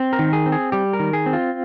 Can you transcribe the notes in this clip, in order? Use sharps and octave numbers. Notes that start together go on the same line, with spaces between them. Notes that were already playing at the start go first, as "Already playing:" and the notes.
Already playing: C4
A#4
D#3
G#4
C4
G#4
G3 G4
A#4
D#3
G#4
C4
F4